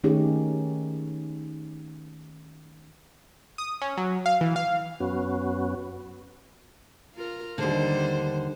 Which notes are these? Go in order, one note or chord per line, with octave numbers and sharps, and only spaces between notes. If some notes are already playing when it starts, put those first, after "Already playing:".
D#3 A3 C#4 D#4 G4 G#4
D#6
C#4
F#3
F5
E3
F5
F#2 B3 C#4 F#4
F4 A#4
D#2 D3 G3 D4 C5